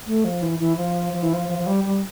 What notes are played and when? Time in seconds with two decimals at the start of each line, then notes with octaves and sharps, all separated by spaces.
0.06 A3
0.25 F3
0.42 E3
0.59 E3
0.77 F3
1.13 F3
1.23 E3
1.33 F3
1.48 F3
1.58 F3
1.67 G3
1.84 G3